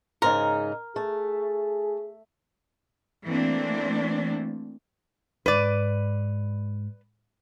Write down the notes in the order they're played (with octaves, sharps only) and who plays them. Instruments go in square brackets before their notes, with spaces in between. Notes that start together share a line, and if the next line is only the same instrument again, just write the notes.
[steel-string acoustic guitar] G#2 C#3 D#4 [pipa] A#4
[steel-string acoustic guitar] A3 [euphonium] G#4
[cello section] E3 A3 A#3 C4 D4
[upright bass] G#2 [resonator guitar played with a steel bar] B4 D5